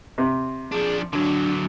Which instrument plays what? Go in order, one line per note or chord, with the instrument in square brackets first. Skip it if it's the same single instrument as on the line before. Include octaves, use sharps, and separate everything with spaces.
[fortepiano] C3
[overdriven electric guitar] F3 D4 [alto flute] G#4
[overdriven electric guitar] D3 F#3 [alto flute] D4